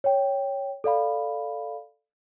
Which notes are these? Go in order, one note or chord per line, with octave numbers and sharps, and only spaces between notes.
C#5 G5
A4 D5 F5 B5